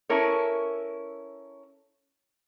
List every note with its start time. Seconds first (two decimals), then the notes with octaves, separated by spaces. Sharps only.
0.09 C#4 E4 A4 A#4 C#5